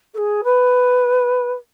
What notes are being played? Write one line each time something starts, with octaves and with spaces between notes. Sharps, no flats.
A4
G#4
B4